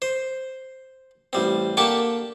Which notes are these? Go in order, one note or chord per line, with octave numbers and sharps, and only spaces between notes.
C5
A1 G3 C4
D3 A#3 G4 G5 A5 C#6